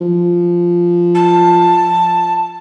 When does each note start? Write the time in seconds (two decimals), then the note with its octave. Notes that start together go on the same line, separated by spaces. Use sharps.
0.01 F3
1.15 A5